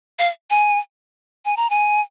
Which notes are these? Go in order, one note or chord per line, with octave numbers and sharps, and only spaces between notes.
F5
G#5
G#5
A#5
G#5